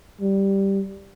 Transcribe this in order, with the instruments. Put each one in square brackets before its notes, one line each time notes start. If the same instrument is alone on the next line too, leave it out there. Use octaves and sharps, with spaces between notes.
[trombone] G3